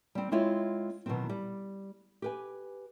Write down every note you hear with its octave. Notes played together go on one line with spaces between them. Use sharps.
G3 C4
G#3 C4 E4 F4 C#5 F5
B2 D#3 E3 F#3 C4
G3
G4 B4 G#5